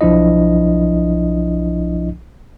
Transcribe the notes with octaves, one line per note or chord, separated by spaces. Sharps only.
B1 F3 D4 E4 D#5